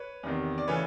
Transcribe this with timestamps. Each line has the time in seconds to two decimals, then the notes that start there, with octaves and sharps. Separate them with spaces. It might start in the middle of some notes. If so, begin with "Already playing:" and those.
Already playing: B4 C#5
0.23 E2 C3 D#3
0.58 D5
0.68 C#3 E3 A3 B4 C#5